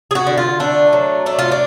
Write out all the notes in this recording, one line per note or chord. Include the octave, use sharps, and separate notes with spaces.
G#4
F#4
D3
F4
A3 D4
F#3
A3 D4
F4
D4